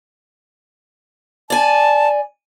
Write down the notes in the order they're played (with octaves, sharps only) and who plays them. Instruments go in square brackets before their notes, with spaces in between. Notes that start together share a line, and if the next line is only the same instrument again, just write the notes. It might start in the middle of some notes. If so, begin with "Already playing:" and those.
[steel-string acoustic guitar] D5 G#5 [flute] A5